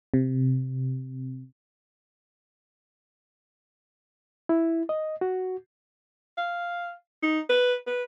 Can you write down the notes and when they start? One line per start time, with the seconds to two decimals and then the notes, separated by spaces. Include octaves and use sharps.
0.14 C3
4.49 E4
4.89 D#5
5.21 F#4
6.38 F5
7.23 D#4
7.50 B4
7.87 B4